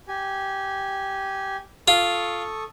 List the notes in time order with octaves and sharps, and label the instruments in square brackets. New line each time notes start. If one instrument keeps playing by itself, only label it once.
[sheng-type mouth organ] G4 G#5
[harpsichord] F4 [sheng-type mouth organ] A4 C#6 D#6